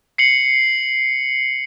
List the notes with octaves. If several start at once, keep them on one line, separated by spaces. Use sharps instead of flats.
C7 C#7 F#7